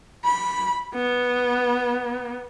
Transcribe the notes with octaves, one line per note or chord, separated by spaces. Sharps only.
B5
B3